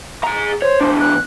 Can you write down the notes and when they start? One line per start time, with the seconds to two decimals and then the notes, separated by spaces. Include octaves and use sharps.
0.24 G#4 A#5
0.62 C5 C#5
0.81 E2 D4
1.00 F#6